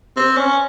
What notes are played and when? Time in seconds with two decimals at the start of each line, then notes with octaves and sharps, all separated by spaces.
0.17 C4
0.37 C#4